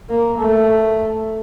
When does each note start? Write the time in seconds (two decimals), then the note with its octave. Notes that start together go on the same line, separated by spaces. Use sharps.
0.09 A#3
0.38 A3